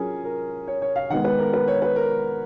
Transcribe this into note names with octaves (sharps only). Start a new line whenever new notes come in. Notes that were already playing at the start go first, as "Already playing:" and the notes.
Already playing: F#3 C#4 F4 G#4 A#4
A#4
C#5
C#5
F5
D#3 G#3 B3 F#5
B4
A#4
B4
C#5
B4
A#4